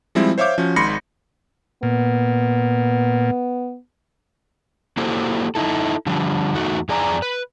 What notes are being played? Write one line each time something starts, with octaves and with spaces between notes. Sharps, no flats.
F3 G3 G#3 C4 E4
C5 C#5 E5 F5 D6 G6
F3 C#4 F#4
G#1 G#2 B5 C6 A#6 C#7
A#2 B3
A#3 E4 F#4 G4 A4 C5
D#4 E4 A4
D3 F3 G3
E2 A3 D#4 F#4
F2 G#4 D5 G#5 A#5
B4